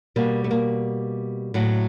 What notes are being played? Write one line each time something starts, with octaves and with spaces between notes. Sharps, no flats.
B2 G3 A#3
A3
A#3
A2 F#3